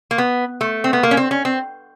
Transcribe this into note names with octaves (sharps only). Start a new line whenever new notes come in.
A#3
B3
A3
C4
B3
A#3
C#4
C4
C#4
C4